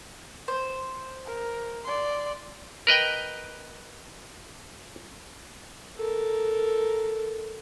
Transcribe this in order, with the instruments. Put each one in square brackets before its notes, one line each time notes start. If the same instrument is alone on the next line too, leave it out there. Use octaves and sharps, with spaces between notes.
[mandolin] C5
[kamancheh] A#4
D5 C6
[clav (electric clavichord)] A#4 B4 D#5 G5
[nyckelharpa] A4 A#4